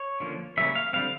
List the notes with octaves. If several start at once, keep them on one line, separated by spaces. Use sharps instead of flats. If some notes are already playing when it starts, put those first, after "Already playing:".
Already playing: C#5
D3 F3 A#3 C#4
C#3 E3 G3 A#3 C#4 E5
F5
D3 G3 C4 F5